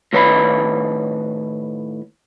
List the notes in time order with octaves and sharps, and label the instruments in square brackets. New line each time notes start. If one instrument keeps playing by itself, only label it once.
[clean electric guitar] A2 D#3 B4 C#5 E5 B5